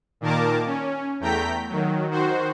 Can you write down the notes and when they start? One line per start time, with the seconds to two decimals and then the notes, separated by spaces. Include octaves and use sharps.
0.21 A#2 D#3 A#3 A#4 A5 D6
0.66 C#4
1.20 E2 A3 G5 A#5 G6 B6
1.69 D#3 F#3
2.11 D#3 F#4 C5